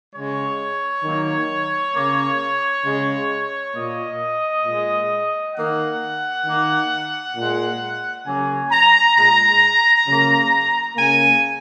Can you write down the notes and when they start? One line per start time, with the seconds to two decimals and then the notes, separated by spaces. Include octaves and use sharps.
0.14 C#3 G#3 C#5
1.05 D#3 F#3 A#3
1.95 C#3 A#3
2.85 C#3 G#3
3.75 A#2 A#3 D#5
4.65 A#2 G#3
5.55 D#3 A#3 F#5
6.45 D#3 A#3
7.36 A#2 G#3
8.26 C#3 F#3 A#3 G#5
8.71 A#5
9.16 A#2 G#3 A#5
10.06 C#3 F#3 A#3
10.96 C#3 A#3 G#5